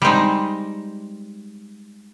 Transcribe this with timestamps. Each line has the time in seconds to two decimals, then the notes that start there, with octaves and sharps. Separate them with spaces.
0.02 G3 G#3 C4 D#4